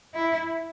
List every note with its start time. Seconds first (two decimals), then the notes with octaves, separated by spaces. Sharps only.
0.14 E4